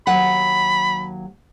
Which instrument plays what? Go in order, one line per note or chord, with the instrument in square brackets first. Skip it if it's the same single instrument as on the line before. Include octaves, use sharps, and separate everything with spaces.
[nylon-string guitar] D#2 F#3 F#5 [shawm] B5